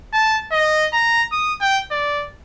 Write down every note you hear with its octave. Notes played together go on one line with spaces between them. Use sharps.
A5
D#5
A#5
D#6
G5
D5